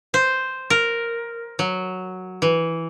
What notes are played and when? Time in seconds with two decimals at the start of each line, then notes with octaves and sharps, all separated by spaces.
0.14 C5
0.70 A#4
1.59 F#3
2.42 E3